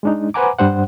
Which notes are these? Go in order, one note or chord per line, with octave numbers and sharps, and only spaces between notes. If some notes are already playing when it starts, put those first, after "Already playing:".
G#3 D4 D#4
B4 C5 F#5 G#5 A#5 D6
G2 G3 D4 C5 F#5